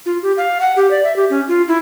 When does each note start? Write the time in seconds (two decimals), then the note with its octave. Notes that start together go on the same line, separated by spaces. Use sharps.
0.06 F4
0.22 G4
0.37 F5
0.60 F#5
0.76 G4
0.91 D5
1.04 E5
1.16 G4
1.30 C#4
1.48 F4
1.68 E4